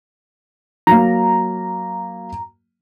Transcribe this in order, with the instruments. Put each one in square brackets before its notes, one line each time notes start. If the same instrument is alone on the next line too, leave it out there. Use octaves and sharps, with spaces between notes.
[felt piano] F#3 A#3 [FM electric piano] A#5